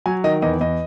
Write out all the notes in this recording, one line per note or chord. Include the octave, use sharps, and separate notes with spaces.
F#3 G#5
D#3 D#5
E2 D#5
E2 D#5